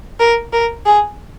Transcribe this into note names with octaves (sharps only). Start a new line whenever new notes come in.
A#4
A#4
G#4